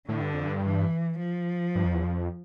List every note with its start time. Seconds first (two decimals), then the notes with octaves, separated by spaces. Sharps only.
0.09 A2 D3
0.21 G2
0.34 F2
0.46 G2
0.64 E3
1.20 F3
1.75 G2
1.85 F2
1.94 E2
2.04 F2